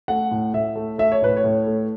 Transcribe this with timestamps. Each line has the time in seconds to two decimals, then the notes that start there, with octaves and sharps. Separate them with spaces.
0.08 A3 F#5
0.31 A2
0.54 A2 E5
0.76 A3
0.98 A3 E5
1.12 C#5
1.22 A2 B4
1.37 C#5
1.44 A2
1.67 A3